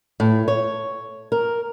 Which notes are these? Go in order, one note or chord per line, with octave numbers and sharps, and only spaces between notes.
A2
C#5
A#4